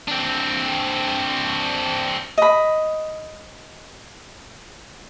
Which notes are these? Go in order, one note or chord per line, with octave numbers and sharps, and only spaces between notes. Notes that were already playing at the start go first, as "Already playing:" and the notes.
C4 D4
D#5 B5